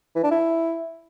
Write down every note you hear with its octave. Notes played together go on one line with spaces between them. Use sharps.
E3
D4
E4